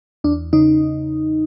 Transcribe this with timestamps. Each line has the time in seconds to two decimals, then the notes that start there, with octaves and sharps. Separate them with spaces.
0.24 E2 D4
0.53 C#3 D#4